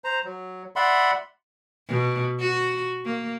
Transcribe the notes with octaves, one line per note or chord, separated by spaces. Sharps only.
C5 A#5
F#3
D5 E5 F#5 B5 C6
B2
F#4
A#3